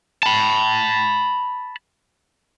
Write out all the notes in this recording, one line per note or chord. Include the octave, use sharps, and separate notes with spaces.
A5 B5